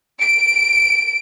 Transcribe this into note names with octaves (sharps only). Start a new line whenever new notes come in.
D7